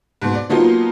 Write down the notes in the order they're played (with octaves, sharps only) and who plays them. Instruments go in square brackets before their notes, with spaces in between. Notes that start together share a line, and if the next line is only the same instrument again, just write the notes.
[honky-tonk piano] G#2 B2
D5
F3 F#3 A#3 B3 D#4 F4